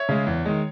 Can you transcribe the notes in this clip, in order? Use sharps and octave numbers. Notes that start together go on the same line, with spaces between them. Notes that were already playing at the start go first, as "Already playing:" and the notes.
Already playing: C#5 E5
C#3 G#3
E2
D#3 G#3